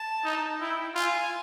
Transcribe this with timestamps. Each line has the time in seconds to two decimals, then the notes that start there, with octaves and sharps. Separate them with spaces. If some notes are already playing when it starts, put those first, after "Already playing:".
Already playing: A5
0.25 D#4
0.60 E4 G5
0.95 F4 G#5